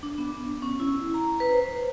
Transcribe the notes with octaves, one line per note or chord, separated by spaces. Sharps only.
D4
B3
C#4
E4
A#5
B4
C5